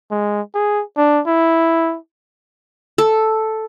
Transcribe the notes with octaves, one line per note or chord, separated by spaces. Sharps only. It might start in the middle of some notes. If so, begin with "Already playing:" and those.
G#3
G#4
D4
E4
A4